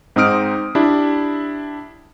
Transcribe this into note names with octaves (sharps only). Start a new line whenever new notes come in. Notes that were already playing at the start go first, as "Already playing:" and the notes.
G#2 C4 D#4 D#6 F6 D7
D4 E4 G4